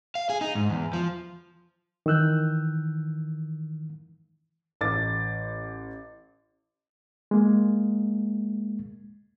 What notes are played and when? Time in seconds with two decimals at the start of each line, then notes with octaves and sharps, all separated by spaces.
0.15 F5
0.30 G#4
0.41 D#4
0.55 G#2
0.70 E2
0.93 F3
2.06 D#3 E3 E6 F#6 G6
4.81 A1 D6 A6
7.31 G#3 A#3